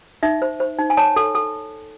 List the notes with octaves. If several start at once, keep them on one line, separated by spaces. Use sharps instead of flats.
D#4 E5
C5
C5
D#4
G#5
C#5 A5
A4
A4